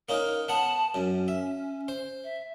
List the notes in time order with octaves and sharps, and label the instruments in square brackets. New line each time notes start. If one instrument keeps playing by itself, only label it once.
[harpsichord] A#3 C#4 D#4 [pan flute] A#4
[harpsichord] B3 F#5 [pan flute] A5
[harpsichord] F#2 [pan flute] C#4
[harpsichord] E5
C5
[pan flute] E5